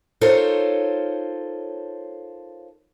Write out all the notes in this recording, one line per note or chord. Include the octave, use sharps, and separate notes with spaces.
D#4 F4 A4 A#4 C5 C#5